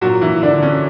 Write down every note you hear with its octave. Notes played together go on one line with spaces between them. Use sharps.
A#2 F#3 F#4
E3 E4
D3 D4
C#4